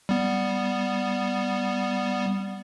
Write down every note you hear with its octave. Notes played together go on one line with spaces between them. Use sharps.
G3 B3